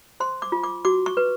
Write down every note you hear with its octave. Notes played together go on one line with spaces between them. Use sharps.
C5 C6
D6
F4
D6
F#4 D6
C#6
B4